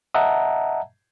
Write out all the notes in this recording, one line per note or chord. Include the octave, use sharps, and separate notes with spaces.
D#5 E5 F#5 A5 A#5